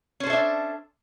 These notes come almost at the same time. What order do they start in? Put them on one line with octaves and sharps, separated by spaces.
C#4 C5 A4 E5 D4